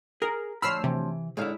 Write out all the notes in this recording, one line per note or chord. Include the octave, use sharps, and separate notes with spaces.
G#4 A#4
D2 F3 C#5 B5 E6 F6 C7
C3 E3
G#2 D3 E4 C#5 F5